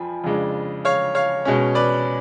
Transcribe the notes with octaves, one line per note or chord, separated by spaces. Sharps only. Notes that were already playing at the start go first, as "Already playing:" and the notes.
Already playing: F2 F3 G#5 B5
F2 C#3 G#3 D4
C#5 F5
C#5 F5
B2 G#3 C#4
B4 D5